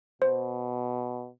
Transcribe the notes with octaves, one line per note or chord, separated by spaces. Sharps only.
B2 C5